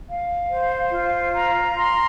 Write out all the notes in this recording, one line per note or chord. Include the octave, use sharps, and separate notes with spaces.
F5
C5
F4
A#5
C6